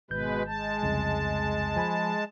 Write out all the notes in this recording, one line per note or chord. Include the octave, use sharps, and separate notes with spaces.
G#1 B2 G#3 B4 G6
G#3 A5
C2 F2 C#3
F3 G#5 B5